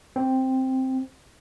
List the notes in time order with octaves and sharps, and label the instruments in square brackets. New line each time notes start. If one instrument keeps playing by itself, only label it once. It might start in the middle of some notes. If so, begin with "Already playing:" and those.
[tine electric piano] C4